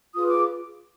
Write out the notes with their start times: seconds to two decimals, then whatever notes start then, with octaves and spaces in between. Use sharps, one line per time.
0.14 F4 G#4 B4 D#6
0.27 D6